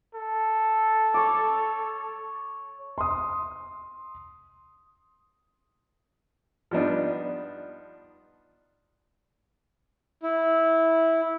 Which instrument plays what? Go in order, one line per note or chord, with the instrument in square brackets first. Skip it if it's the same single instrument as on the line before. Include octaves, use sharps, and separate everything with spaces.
[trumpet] A4
[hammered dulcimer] C#5 D6
[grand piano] C6 D#6
[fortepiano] F3 G3 B3 D4 D#4
[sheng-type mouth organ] E4